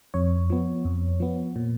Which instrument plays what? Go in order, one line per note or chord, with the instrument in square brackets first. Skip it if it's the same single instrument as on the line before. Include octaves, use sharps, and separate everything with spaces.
[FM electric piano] F2 C#5
F3 B3
F2
F3 B3
A#2